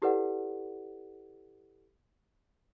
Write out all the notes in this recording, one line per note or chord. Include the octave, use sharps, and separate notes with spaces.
E4 G4 A4 B4 D5 F#5